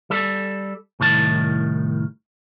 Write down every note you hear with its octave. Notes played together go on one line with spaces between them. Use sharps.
G3 A4
C2 A2 D#3 A5